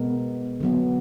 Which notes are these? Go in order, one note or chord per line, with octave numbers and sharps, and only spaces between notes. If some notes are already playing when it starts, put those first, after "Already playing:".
Already playing: B2 G#3 B3 A#4
D3 F#3 B3